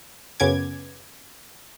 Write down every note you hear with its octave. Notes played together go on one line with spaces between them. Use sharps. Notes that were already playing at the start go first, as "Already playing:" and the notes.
F#2 C#3 B3 C#4 D6 G#6